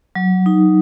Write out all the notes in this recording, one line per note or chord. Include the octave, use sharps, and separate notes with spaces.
F#3
D#4